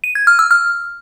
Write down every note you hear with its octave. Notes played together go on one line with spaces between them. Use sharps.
D#7
G#6
F6
E6
F6